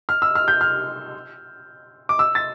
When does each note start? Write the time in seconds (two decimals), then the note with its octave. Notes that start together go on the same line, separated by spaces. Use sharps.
0.09 F6
0.22 E6
0.35 F6
0.48 G6
0.61 F6
2.09 D6
2.19 E6
2.35 A6